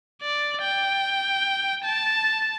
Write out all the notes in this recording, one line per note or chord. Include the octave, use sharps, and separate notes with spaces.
D5
G5
A5